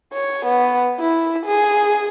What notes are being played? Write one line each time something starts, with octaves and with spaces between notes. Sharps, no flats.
C#5
B3
E4
G#4